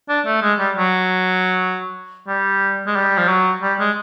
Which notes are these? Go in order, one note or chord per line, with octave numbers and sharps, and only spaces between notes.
D4
A3
G#3
G3
F#3
G3
G#3
G3
F3
F#3
G3
G#3